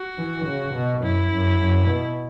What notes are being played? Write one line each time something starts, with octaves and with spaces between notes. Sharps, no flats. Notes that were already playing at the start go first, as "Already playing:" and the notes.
Already playing: F#4
E3
C#3
B2
F#2 E4
F#2
F#2
B2